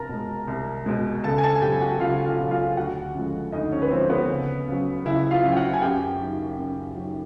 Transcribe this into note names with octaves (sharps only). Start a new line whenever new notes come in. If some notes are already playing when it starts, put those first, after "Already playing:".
Already playing: C2 A#4 A5 A#5
B2 G#3
C2
B2 G#3
C#2 A4 A5
G#5
A4 A5
G#5
B2 F#3 G4 G5
F#4 F#5
C#2 F4 F5
F4 F5
B2 F#3
F4 F5
F5
D2 F#4 F#5
C#3 F3 G#3
D2 D#4 D#5
C#4 C#5
B4
C#3 F3 G#3 C4 C5
B3 B4
C#2
C#3 F#3
C#2 E4 E5
F4 F5
C#3 F#3
G5
F#4 F#5
G#5
F#2 G4 G5
D#3 F#3
F#2
D#3 F#3